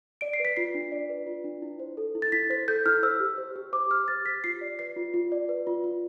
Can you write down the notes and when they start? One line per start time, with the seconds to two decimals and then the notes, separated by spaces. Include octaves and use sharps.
0.21 D5 D7
0.33 C7
0.40 B4
0.45 B6
0.56 F4 C7
0.74 D4
0.92 D5
1.10 B4
1.27 F4
1.44 D4
1.62 E4
1.79 C5
1.97 A4
2.15 E4
2.22 A6
2.32 E4 B6
2.50 C5 B6
2.68 A4 G6
2.86 E4 F6
3.03 C5 E6
3.20 G4
3.38 C5
3.56 G4
3.73 C5 D6
3.91 G4 F6
4.08 C5 A6
4.26 G4 B6
4.44 F4 C7
4.61 D5
4.79 B4 C7
4.96 F4
5.14 F4
5.32 D5
5.49 B4
5.67 F4
5.84 F4